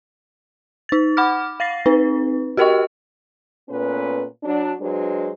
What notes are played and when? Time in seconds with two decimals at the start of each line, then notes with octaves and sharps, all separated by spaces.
0.89 D#4 A6
1.17 F#5 B5 D6 F6
1.60 F5 A6 A#6 C7
1.86 C4 D#4 B4
2.57 F#4 G4 A#4 D#5 G5 C#6
3.69 A#2 A3 B3 C#4 B4
4.43 F#3 D4
4.80 F#3 G#3 D4 B4 C5